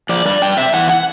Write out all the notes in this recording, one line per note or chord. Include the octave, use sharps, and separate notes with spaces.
F3 D5
G2 D5
G2 G5
C3 E5
E3 F#5
F#5